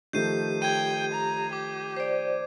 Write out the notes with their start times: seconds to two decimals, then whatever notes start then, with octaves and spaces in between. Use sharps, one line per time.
0.13 D#3 F3 A3 G4 G6 C7 D#7
0.62 G5 G#6 D#7
1.12 A#5
1.53 G4 D6
1.96 C5 D5